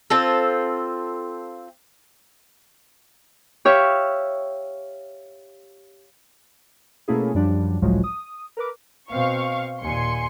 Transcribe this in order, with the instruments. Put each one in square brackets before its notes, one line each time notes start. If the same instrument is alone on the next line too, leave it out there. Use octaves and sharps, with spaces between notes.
[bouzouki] C4 F4 A4
[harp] G4 C#5 E5 F5
[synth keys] B2 A3 A#3 C#4 E4 G#4
F#2 F3 G3 D4
G#1 C#2 A2 F3 F#3 G#3
D#6
A#4 B4 D6
[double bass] B2 C4 [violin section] F5 C#6
[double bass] D#2 A#2 [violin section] G#5 C6 C#7